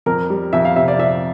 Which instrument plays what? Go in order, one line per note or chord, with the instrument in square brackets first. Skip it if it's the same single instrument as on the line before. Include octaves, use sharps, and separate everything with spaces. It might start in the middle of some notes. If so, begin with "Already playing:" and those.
[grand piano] F2 A#4
G3
F2 E5
F5
C3 E5
D5
F2 E5